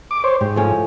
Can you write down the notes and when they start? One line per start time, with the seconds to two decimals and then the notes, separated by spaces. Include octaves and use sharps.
0.11 D6
0.24 C5 C#5
0.41 G#2 G4
0.56 A2 F3 C#4